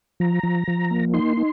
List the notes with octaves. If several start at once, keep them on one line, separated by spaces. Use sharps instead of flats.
F3 A#5
F3
F3
A#3
D#4 C6
D#4